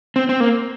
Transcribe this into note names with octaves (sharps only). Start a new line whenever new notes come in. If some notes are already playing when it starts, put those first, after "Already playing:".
C4
C4
A#3